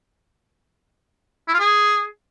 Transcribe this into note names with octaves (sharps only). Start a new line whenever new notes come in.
E4
F4
G#4